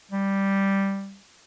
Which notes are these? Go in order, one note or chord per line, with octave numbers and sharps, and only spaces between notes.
G3